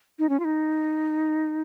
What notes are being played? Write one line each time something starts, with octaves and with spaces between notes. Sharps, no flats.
D#4
C#4
F4
D#4